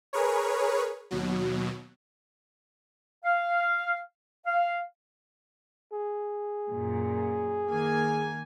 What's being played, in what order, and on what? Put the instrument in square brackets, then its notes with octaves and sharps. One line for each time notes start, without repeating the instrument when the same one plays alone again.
[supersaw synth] G#4 A#4 B4 C#5
D#2 B2 F#3
[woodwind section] F5
F5
[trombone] G#4
[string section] F#2 A#2
D#3 A#3 G#5